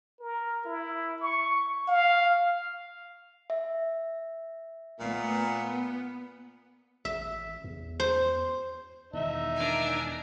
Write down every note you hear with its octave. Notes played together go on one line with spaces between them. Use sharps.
A#4
E4
C#6
F5
E5
A#2 G#3 A3 B3
A1 E5
E2
C5
E1 E2 D#3 D#4 E5
D4 A#4 G#5